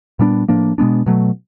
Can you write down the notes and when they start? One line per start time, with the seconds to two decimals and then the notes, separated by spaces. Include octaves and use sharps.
0.19 A#2 G3 B3 D4
0.48 A2 F3 A#3 D4
0.78 B2 G#3 B3 D4
1.06 B2 F#3 A3